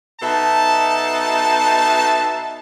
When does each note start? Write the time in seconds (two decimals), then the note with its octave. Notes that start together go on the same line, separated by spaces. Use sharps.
0.21 B2 D#4 A4 E5 A5